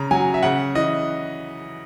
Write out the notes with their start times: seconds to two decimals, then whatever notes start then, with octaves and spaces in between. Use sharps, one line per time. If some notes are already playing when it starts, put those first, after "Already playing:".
Already playing: C#3 A#5
0.11 F#3 G#5
0.34 E5
0.43 C#3 F#5
0.75 E3 D#5